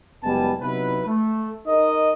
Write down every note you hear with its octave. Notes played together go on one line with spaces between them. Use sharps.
F#1 G3 G#3 B3 G#5 A5
C3 F#3 B3 D#4 E4 B4
A3
D#4 G#4 A#4 D#5